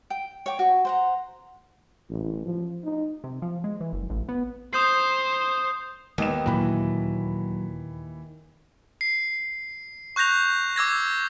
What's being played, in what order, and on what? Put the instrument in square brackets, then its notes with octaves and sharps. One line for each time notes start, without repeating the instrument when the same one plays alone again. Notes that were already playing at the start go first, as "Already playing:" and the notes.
[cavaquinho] G5
C#5 G5 D6
F#4
C5 F#5 A#5
[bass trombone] A1
F3
D#4
[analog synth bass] C3
F3
G#3
E3
F#1
A1
B3
[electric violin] C5 [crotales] D#6 G6 C7
[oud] D#2 [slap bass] D#3 G#3 [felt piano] B3 D#4 E7
[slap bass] D2 A#2 [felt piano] E3 B5 [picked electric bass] F#3
[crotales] C7
C#6 F#6 G6 A#6 F7
D6 E6 G#6 A#6